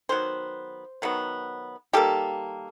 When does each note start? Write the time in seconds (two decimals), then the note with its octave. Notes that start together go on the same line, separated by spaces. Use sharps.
0.09 D#3 F#3 B3 C5
1.02 D#3 F#3 B3
1.93 D#3 G3 A#3 G4 A4